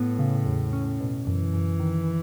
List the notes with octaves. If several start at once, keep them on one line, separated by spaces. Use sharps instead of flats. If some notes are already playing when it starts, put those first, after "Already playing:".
Already playing: A2 B3
C#3
E2
C#4
B2
F#2 E3
F#2
D#3